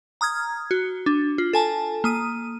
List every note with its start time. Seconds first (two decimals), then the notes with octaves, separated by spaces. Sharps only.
0.21 A#5 D#6 F6 G#6
0.71 F#4
1.06 D4
1.38 F4
1.53 A4 G#5 A5
2.04 A#3 D#6 D#7